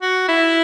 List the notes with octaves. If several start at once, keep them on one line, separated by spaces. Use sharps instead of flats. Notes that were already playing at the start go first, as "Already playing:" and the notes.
F#4
E4